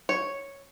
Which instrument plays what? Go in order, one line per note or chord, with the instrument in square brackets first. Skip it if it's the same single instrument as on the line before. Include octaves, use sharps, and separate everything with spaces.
[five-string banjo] C#5